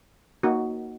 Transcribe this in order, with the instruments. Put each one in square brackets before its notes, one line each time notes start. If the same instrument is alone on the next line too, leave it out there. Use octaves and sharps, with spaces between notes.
[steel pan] A#3 D#4 F#4